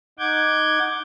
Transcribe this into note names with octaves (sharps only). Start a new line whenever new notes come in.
D#4 F#5 D6 G6 G#6